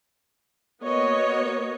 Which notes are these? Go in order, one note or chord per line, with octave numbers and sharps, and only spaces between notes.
A#3 B3 F#4 C#5 D#5